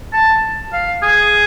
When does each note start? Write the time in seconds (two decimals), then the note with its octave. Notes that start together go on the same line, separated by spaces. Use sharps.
0.13 A5
0.73 F5
1.02 G#4